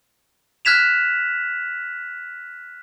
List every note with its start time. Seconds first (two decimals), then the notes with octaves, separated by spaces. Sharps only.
0.65 F6 F#6 G#6 B6 E7 F7